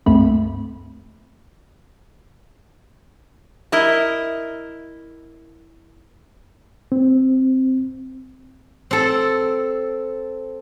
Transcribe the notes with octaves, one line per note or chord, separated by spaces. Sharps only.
C#2 G2 A3 A#3 C4 B5
E4 A#4 D#5
C4
C4 A4